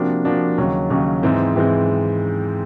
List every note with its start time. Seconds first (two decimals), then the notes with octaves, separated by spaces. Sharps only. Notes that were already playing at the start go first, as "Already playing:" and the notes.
Already playing: C3 F3 A#3 D4 F#4
0.24 C3 F3 A#3 D4 F#4
0.58 D#2 C#3 F#3
0.90 D#2 C#3 F#3
1.23 G#2 E3 G#3 C4
1.56 G#2 E3 G#3 C4